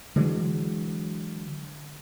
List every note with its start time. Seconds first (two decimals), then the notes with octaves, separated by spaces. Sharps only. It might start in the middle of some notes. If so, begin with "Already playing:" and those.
0.16 D3 E3 F#3 G#3